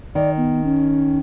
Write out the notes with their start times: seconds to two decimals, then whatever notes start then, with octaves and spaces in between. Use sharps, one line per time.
0.15 D#3 D5
0.37 B3
0.64 C#4